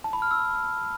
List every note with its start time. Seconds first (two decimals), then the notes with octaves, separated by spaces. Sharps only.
0.04 A5
0.13 B5
0.22 F6
0.31 E6